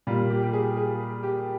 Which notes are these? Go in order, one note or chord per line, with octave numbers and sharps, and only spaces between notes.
A#2 G3 F4
G4
G4
G#4
G#4
G4